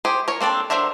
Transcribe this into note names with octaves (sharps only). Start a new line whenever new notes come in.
G4 G#4 C5
A#4 C#5
A#3 C4 D4 A4
F#3 D4 A#4 C5 E5